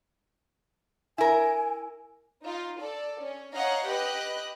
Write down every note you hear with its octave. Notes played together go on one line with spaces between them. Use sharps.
E4 A#4 G#5
D#4 F4
A4 D5
C#4
C#5 D#5 F5 F#5 A#5
G4 B4 D#5 F#6